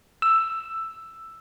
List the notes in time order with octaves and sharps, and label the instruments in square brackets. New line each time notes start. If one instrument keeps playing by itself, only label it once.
[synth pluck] E6